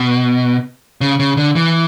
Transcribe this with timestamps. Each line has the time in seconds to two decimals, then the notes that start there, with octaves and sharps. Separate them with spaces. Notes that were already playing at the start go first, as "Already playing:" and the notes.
Already playing: B2
1.01 C#3
1.19 C#3
1.37 D3
1.55 E3